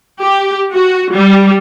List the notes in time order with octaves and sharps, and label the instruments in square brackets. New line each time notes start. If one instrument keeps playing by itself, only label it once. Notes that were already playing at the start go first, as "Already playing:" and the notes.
[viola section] G4
F#4
G3